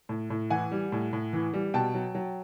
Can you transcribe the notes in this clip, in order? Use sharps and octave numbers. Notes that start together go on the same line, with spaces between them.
A2
A2
E3 F#5 G#5
G3
A2
A2
E3
G3
B2 G5 A5
F#3
F#3